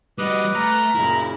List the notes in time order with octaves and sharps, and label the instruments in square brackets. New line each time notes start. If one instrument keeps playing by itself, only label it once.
[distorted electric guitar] G3 F#4 [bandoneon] B4 D6 [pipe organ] D#5 D#6
[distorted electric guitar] A3 [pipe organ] A#5 F6 A#6
[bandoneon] F#2 A#2 C#3 [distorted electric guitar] E4